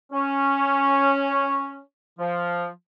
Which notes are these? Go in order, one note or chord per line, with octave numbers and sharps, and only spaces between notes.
C#4
F3